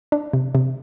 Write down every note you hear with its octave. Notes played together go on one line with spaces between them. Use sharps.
D4
C3
C3